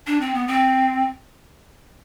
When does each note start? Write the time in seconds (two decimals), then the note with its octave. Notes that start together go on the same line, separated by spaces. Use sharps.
0.07 D4
0.21 C4
0.34 B3
0.48 C4